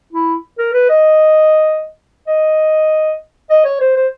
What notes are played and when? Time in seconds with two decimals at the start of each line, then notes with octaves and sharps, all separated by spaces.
0.13 E4
0.58 A#4
0.73 B4
0.89 D#5
2.28 D#5
3.50 D#5
3.65 C#5
3.81 C5
3.96 C5